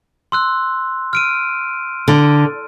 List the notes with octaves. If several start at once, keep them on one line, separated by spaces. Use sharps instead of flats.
C6 E6 F#6
F6 D7 D#7
D3